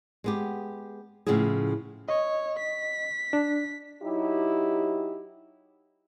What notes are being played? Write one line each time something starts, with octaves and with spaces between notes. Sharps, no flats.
G#3 B3 G4
A2 C#3 F3 B3 E4 G#4
C#5 D#5
B6
D4
F#3 D#4 E4 G4